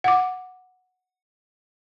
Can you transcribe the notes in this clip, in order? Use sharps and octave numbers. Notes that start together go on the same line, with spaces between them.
F#5 D6